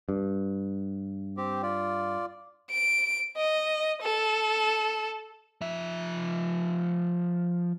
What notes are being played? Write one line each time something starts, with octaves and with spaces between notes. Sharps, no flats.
G2
C4 G4
F4 D5
D7
D#5
A4
F3 E5